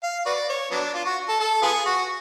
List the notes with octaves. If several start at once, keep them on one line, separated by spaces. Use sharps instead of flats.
F5
F#4 B4 D5
C#5
F#3 B3 D4
F4
F#4
A4
A4
B3 F4 G#4
F#4